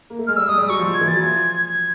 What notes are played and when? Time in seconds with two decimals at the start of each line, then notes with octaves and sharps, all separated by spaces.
0.10 A#3
0.19 A3
0.27 G#3 F6
0.36 G3 E6
0.48 G#3 D#6
0.58 G3 E6
0.69 F#3 C#6
0.79 F3
0.94 G#6
1.01 E3
1.08 A6
1.16 F#3
1.22 F3 G#6
1.66 G#6